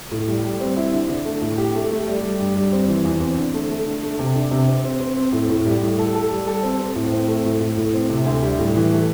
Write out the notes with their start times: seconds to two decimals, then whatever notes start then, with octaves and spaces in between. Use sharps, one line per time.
0.11 A2
0.28 G3
0.44 G3
0.60 C4
0.77 E4
0.93 D3
1.09 D3
1.25 A3
1.41 A2
1.58 G4
1.75 A3
1.91 A3
2.07 G3
2.23 G3
2.39 G2
2.56 G3
2.72 C4
2.88 E3
3.05 E2
3.21 C4
3.37 D3
3.54 A3
3.70 A3
3.86 D3
4.03 A3
4.19 C3
4.35 D4
4.51 C3
4.68 C4
4.84 C4
5.00 C4
5.16 C4
5.32 A2
5.49 A2
5.65 G3
5.82 A2
5.98 A4
6.14 A4
6.31 G3
6.47 A4
6.63 C4
6.79 C4
6.95 A2
7.12 C4
7.28 A3
7.45 A2
7.61 A2
7.77 A2
7.93 C4
8.10 C3
8.26 D2
8.42 G3
8.59 A2
8.75 E3
8.92 A3